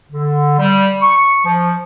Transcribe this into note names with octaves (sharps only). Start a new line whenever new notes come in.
D3
G3
C#6
F3